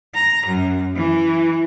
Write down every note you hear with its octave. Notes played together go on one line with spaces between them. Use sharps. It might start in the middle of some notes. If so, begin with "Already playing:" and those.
A#5
F#2
E3